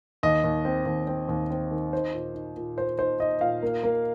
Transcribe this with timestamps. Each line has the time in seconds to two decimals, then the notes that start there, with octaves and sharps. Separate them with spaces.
0.23 D#2 D#5
0.44 D#2
0.65 C4
0.86 D#2
1.07 C4
1.29 D#2
1.50 C4
1.71 D#3
1.92 D#4 C5
2.13 A#2
2.35 D#4
2.57 A#2
2.77 A#2 C5
2.99 D#4 C5
3.20 D#4 D#5
3.41 A#2 F5
3.63 A#3
3.83 A#3